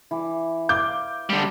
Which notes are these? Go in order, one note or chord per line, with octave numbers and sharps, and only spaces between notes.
E3 D6
F5 D6 G6
D3 G3